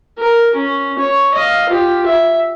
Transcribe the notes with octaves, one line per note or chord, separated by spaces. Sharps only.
A#4
C#4
C#5
D#5 F5
F4 G4
E5